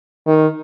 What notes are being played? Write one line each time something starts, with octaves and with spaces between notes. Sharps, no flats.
D#3